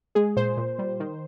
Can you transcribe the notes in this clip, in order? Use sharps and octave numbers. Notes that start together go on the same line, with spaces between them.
G#3 G#4
A#2 C5
A#2
G3
D#3